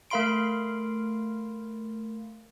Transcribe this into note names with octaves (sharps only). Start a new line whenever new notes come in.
A3 A#4 F5 B5 C6 D7